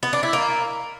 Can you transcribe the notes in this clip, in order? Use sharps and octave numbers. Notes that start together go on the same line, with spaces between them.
B3
D4
E4
A#3